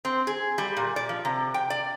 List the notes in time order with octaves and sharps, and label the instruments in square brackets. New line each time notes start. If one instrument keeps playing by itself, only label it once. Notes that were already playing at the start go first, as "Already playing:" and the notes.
[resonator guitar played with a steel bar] C4
G#4
G3
A#2
D5
F3
C3
G5
D5